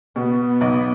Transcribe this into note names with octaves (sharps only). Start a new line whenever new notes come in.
B2 B3
B3
B1